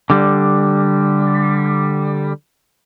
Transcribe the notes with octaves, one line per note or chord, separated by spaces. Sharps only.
D3 G3